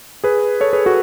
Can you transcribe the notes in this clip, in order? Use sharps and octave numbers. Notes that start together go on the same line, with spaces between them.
G#4 B4
A4 C#5
G#4 B4
F#4 A4